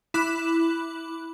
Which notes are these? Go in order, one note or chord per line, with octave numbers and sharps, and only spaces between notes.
E4 B5 D6 F#6